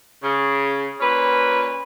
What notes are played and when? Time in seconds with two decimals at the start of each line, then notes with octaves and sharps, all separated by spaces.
0.23 C#3
1.01 A#2 C#4 B4